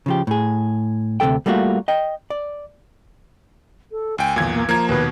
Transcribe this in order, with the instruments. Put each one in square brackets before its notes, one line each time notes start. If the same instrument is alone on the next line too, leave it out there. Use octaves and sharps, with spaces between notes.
[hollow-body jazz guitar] C#3 F3 G4
A2 G#4
D2 C3 F3 A4 G5
G3 A3 A#3 F4 F#4
D#5 G5
D5
[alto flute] A4
[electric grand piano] C#2 G5 [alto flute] G#5
[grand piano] B1 E2 [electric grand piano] A#2 G#6
[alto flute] A#3
[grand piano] F3 [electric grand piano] A#3 G#6 [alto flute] A#5
[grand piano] D#2 B2 [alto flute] B4